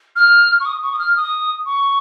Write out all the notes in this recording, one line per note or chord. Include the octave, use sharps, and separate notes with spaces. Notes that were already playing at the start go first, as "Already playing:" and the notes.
F6
C#6
D#6
C#6
D#6
F6
D#6
C#6